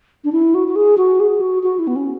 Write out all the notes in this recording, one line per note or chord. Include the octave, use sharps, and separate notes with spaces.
D4
E4
F#4
F#4
G#4
F#4
G#4
F#4
F#4
E4
B3
C#4